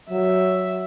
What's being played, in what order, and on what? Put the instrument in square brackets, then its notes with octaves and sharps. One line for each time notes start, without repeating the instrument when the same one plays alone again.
[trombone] F#3 [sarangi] E5